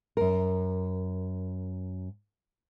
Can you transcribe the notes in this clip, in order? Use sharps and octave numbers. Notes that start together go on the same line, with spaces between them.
F#2 A#4